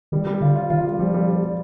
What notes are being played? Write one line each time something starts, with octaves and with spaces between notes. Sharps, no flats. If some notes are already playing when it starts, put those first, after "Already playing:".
D#3 G3
G3
D3 F4
F4
D#3 F4
G3
F3 G3
G3
G3
G3